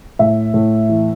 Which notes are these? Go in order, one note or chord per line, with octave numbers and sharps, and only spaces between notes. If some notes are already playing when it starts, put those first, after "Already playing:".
A2 E5
A2
E3